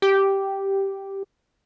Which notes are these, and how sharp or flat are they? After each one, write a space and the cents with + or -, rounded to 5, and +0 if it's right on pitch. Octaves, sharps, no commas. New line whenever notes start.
G4 -5